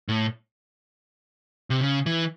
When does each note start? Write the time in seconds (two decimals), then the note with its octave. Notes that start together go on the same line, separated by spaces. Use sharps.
0.08 A2
1.70 C3
1.81 C#3
2.06 E3